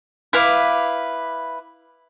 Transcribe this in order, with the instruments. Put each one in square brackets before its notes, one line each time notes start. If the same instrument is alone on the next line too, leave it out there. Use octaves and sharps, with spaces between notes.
[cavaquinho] E4 B4 F5 D6